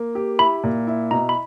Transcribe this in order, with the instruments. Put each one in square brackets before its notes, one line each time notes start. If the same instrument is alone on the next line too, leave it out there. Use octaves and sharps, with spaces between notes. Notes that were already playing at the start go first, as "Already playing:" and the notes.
Already playing: [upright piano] A#3
G4
[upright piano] E4 [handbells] B5
[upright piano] A#2
E4
[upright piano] B2 [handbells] A#5
[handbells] B5